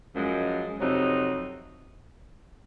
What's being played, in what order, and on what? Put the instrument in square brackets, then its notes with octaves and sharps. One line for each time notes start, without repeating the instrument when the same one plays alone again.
[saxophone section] F#2 F3 G#3
F2 C3 F#3 C4 D#4